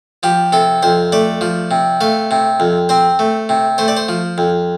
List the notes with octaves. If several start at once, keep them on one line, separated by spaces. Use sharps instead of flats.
F3 G4
C3 A4
F2 C5
A3 D5
F3
C3
A3 F5
C3
F2
C4 C5
A3
C3
A3 C5
D5
C5
F3
F2